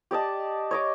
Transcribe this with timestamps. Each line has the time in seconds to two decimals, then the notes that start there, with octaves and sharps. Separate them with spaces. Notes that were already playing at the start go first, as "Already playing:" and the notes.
0.11 G4 D5 D#5 A5
0.71 C#5 D#5 D6